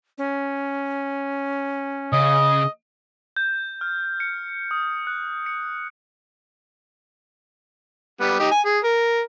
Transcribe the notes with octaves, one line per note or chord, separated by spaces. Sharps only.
C#4
C#3 D#5
G6
F6
C#7
D#6
F#6
C#7
G3 B3
D#4 G4
G#5
G#4
A#4